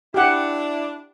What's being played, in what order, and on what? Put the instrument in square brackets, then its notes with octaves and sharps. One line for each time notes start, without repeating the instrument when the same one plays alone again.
[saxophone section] D4 E4 [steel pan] G4 F#5